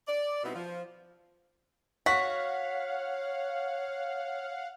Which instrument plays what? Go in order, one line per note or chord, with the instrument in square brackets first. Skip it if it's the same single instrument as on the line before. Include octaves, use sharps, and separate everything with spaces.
[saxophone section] D5
B2 G3 B3 C4 D#4 E4
F3
[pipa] F#4 [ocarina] C#5 [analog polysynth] F5 F#5 [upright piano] B6